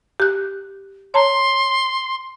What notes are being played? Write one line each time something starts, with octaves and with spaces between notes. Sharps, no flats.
G4 F#6
C#5 A5 A#5 C6